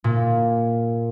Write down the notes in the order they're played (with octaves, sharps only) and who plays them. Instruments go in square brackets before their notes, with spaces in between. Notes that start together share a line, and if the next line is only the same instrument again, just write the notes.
[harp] A#2